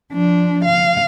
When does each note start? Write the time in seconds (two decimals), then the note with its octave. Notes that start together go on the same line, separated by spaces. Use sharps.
0.12 F3 D4
0.65 F5